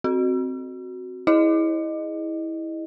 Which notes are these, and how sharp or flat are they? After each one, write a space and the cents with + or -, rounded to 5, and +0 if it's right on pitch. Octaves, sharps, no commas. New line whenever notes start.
C4 +0 F#4 +0
E4 -20 G#4 +0 D#5 -15